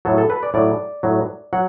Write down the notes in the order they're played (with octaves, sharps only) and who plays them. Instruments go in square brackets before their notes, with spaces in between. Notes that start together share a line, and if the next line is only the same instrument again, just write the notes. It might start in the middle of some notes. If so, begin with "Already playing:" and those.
[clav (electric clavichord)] A2 F#3 A4
A4
B4
D5
A2 F#3 D5
A2 F#3
F#3 F#5